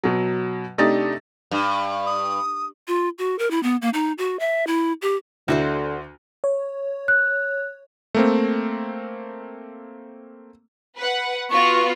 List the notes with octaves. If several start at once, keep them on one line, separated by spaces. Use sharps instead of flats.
B2 F#3
C3 A3 D4 D#4 G4 A6
G2
D#6
F4
F#4
A#4
E4
B3
A#3
D#4
F#4
E5
E4
G4
D2 D3 E4 F#4 C5
C#5
F#6
A3 A#3 C4
B4 F#5
B3 F4 F#4 C#6